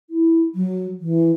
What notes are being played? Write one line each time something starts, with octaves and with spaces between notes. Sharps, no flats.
E4
F#3
E3